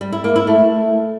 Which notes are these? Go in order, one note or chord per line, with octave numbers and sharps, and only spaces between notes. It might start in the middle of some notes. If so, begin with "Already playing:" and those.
G3
E4
A#3
E4
A3